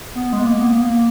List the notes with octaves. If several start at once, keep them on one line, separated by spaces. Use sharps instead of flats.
B3
G#3
A#3
B3
A#3